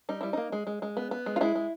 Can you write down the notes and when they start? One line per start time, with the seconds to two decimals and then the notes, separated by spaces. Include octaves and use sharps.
0.09 G3 D#4
0.21 G3 E4
0.33 A#3 D#4
0.52 G#3
0.67 G#3
0.82 G#3
0.97 B3
1.11 B3
1.26 G#3
1.36 F4
1.41 G#3 E4
1.55 G#3